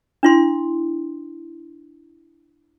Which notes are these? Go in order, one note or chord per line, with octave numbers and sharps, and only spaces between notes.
D4 E4 C6